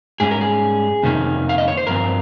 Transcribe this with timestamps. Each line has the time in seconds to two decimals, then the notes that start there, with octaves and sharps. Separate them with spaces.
0.20 G#2 G3 C#4 G#4
0.31 A#4
0.41 G#4
1.03 F2 C3 D#3 A#3 C#4
1.49 F5
1.58 D#5
1.68 C#5
1.77 C5
1.87 G2 F3 C4 A#4